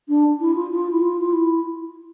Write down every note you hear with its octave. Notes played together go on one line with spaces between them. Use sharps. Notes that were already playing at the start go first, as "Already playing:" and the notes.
D4
E4
F4
F4
E4
F4
F4
E4